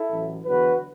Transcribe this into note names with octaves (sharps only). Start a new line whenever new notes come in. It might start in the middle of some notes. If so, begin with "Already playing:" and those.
Already playing: E4 A4
A1 A2 F#3
E2 D3 F#3 F#4 B4